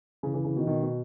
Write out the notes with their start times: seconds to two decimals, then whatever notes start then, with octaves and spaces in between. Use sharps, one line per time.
0.23 C#3 E3
0.34 C#3 E3
0.45 C#3 E3
0.56 B2 D#3
0.67 B2 D#3
0.83 B2